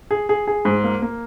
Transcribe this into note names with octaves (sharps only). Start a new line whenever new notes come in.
G#4
G#4
G#4
G#2
A#3
A#3